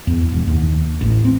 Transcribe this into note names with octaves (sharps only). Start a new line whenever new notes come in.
E2
E1
D#2
A1
C4